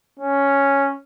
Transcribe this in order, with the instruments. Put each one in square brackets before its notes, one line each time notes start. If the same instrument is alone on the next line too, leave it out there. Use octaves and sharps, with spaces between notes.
[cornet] C#4